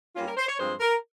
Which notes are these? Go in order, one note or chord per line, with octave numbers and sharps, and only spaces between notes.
G2 G3 A#3 C#4 F4
A#4
C5
C#5
G2 F3 G#3 C4 C5
A#4